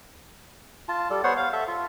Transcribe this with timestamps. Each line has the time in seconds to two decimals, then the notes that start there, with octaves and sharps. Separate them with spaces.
0.88 F4 A5
1.10 G3 A4
1.24 B3 C5 C#5 F#5
1.37 F5
1.53 A4 E5
1.68 F4